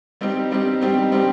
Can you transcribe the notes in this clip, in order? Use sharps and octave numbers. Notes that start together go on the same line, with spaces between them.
G3 C4 D#4 G4
G3 C4 D#4 G4
G3 C4 D#4 G4
G3 C4 D#4 G4